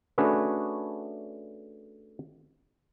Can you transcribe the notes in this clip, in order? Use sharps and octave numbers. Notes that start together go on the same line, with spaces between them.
A3 C#4 D4 F#4 G#4 B4